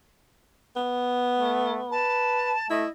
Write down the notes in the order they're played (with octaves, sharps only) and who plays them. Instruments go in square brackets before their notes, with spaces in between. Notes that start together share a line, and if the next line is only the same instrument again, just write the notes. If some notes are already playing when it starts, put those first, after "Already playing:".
[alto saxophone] B3
[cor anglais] A3
[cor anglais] B4 [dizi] A5
[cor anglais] A3 [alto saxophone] E4 [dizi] D#5